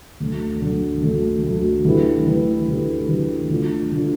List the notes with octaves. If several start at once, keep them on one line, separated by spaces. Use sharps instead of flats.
D2 D3 A3
D2 D3 A3
D2 D3 A3
D2 D3 A3
D3 A3 E4 G4 B4
D3 A3 E4 G4 B4
D3 A3 E4 G4 B4
D3 A3 E4 G4 B4
D3 A3 D4 F4
D3 A3 D4 F4